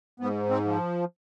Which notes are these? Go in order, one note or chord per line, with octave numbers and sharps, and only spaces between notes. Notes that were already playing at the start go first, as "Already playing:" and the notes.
G#2 B3
C4
F3